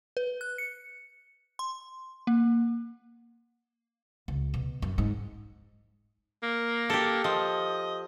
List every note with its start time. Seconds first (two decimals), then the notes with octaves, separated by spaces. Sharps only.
0.17 B4
0.41 F#6
0.58 C#7
1.59 C6
2.27 A#3
4.28 C#2
4.54 B2
4.82 F#2
4.98 G#2
6.43 A#3
6.90 G4 A4
7.24 F3 D#5